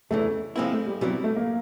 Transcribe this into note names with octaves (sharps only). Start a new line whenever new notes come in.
E2 C#3 E3 A3
F3 G#3 A#3 C4 E4
A3
G3
B2 F#3 G3 C4 E4
A3
A#3